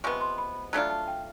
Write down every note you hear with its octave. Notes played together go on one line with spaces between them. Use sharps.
C3 F3 G#3 B3 C#6
C6
B5
F#3 A3 D4 F4 A#5
A5
G5